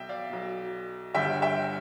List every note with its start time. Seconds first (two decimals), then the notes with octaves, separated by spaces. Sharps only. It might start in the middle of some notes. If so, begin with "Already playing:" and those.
Already playing: B1 B2 E5 G5
0.09 D5 F5
0.30 B1 B2
1.14 G1 G2 D3 E5 G5
1.42 E5 G5